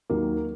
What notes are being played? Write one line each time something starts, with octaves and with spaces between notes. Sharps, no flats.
D#2 D#3 F#3 A#3